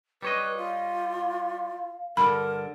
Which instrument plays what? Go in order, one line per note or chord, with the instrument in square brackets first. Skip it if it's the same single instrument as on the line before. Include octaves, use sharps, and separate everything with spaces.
[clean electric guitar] G3 C#5 D#5 [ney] B4
[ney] F4 [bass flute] F5
[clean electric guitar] G2 D3 [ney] A#4 [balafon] B5